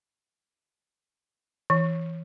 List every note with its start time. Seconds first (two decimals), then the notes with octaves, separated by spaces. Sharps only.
1.70 E3